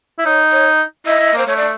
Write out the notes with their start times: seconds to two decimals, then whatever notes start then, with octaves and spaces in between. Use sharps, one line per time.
0.19 E4
0.25 D#4 C#5
0.52 C#5
1.06 E4 D#5
1.20 E4
1.34 A#3 C5
1.47 A3 C#5
1.57 D5